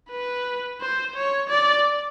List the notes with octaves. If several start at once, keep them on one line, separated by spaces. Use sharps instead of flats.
B4
C5
C#5
D5